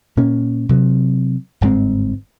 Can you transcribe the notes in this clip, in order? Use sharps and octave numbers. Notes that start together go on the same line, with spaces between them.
A#2 A#3 C#4
C3 F#3
G1 G#2 G#3 C4